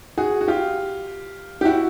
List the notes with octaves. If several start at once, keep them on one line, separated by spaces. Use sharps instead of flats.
F#4 G#4
F#4
F4 G4
G4
E4 F#4